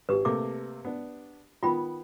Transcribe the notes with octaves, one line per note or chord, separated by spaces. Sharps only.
G#1 G4 B4
C3 A3 A#3 D6
B3 D4
D#3 B3 F4 G5 B5